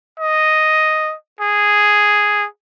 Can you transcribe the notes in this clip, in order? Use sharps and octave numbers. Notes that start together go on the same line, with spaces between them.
D#5
G#4